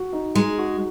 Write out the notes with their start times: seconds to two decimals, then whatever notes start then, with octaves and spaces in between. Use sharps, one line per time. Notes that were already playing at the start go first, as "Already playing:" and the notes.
Already playing: F#4
0.13 D#4
0.35 G#3 D#4
0.58 F#4